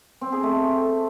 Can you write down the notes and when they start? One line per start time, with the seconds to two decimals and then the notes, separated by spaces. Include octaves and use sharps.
0.21 C4
0.32 G#4
0.43 A3